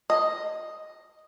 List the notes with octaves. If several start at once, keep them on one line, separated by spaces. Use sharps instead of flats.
D#5